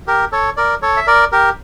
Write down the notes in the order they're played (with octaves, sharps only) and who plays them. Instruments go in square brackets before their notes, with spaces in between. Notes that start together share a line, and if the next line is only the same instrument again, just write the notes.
[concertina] G4 A#4
A4 C#5
A#4 D5
A4 C#5
E5
A#4 D5
G4 A#4